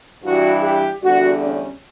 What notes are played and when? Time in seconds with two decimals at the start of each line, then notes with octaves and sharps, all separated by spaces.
0.24 G2 E3 G3 F#4
0.63 G4
1.01 E2 D3 G3 F#4
1.40 C#4